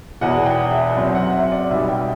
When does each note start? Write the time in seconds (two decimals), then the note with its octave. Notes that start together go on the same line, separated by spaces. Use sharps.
0.21 E1 E2 B2 F#5
0.46 G5
0.71 E5
0.96 F#2 F#3 C4 E5
1.15 F#5
1.33 E5
1.52 D5
1.70 B1 B2 G3 E5
1.89 G5